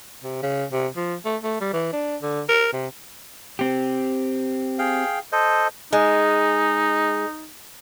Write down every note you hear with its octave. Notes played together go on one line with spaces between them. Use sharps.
C3
C#3
C3
F3
A3
A3
G3
E3
D4
D3
A#4
C3
C4 G4
G#4 F5 G5
A4 C5 D#5
G#3 D#4